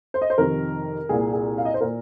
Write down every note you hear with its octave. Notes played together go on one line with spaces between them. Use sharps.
C5
D#5
C5
F2 C3 D#3 A#4
C2 A#2 G#4
G#4
F5
D#5
C5
A#2 A#4